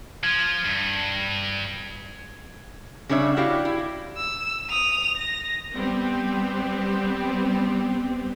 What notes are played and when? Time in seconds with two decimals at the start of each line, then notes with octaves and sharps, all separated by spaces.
0.23 F3 G#6
0.65 G2
3.09 C#3 G3 D4 C#5 E5
3.37 E4 F#4 G4 D5 F5
3.65 E4
4.18 E6
4.69 D#6 F7
5.17 A#6
5.75 G3 B3 C4 G4